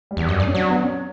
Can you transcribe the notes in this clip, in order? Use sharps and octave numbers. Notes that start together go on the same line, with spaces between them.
G3
E2
F#2
G2 D4
C#4
F#3 D4
B3
C#4